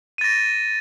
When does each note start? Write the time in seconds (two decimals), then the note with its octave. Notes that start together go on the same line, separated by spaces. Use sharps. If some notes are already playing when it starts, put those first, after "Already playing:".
0.18 D#7
0.21 A6
0.24 A#6